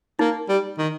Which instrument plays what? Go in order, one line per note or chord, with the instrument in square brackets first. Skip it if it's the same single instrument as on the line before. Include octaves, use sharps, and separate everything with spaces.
[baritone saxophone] A#3 [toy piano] D#4
[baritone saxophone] G3
D#3